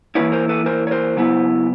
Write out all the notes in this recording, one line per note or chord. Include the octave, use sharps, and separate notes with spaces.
E3 G3 A#3 C#4 E4 B4 C#5
A#4 C5
A4 B4
A#4 C5
C#5
A#4 C5
C#3 F#3 B3 E4